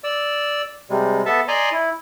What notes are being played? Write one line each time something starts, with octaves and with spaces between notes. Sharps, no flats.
D5 E6
C3 G3 G#3
B3 A4 E5 A5
D5 D#5 G#5 A#5 C6
E4